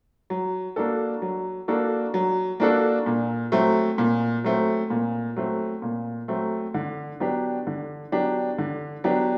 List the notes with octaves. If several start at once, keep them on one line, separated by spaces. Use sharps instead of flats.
F#3
A#3 D4 F#4 A4
F#3
A#3 D4 F#4 A4
F#3
A#3 D4 F#4 A4
A#2
F#3 A3 C4
A#2
F#3 A3 C4
A#2
F#3 A3 C4
A#2
F#3 A3 C4
D3
F#3 B3 D4 G4
D3
F#3 B3 D4 G4
D3
F#3 B3 D4 G4